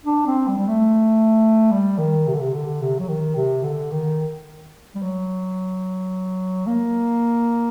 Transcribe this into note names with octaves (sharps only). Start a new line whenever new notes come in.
D4
C4
G3
G3
A3
G3
D#3
C3
D3
C3
D3
C3
F#3
D#3
C3
D3
D#3
G3
F#3
A#3